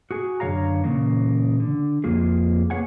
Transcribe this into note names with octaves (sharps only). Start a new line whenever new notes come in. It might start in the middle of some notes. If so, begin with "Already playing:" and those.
F#4 G#4 G#5
F#2 D3 D#3 C#5 F5 A#5
A#2 C#3 E3 A#3
D3
F2 A#3 F4 G#4
A#3 G#4 B4 C#5 F#5 G#5